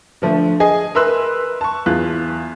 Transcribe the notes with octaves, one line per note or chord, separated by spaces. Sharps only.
D3 F3 A3
G#4 D#5 G#5
A#4 B4 E5 C6 E6 F#6
A5 C#6
E2 F4 F#6